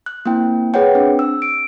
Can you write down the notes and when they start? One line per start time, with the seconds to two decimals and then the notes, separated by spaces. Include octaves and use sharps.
0.06 F#6
0.25 A#3 C4 E4 G5
0.74 G#4 B4 C#5 F#5 G5
0.95 C4 D4
1.19 E6
1.42 D7